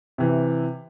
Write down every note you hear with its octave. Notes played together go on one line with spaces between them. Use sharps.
C3 E3